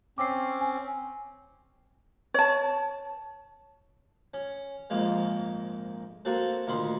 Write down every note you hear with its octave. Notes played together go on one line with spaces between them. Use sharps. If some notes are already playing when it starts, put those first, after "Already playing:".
C4 C#4 D6 C7
G#5
C#5 A5
C#4
A#1 F2 G#2 G#3 A#3
A#3 C4 F#4 A4
D2 A#2 D#3 B5 C6